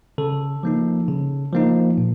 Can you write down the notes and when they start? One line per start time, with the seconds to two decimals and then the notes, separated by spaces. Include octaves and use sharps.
0.18 C#3 A4
0.63 F3 A#3 D#4
1.08 C#3
1.53 F3 A#3 D#4
1.98 A#2